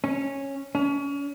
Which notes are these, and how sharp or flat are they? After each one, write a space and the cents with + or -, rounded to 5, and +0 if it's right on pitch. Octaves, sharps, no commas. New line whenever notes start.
C#4 -10
C#4 +30